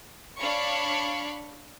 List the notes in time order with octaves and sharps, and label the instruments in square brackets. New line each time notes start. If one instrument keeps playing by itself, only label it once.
[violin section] D4 C#5 F5 B5 C#6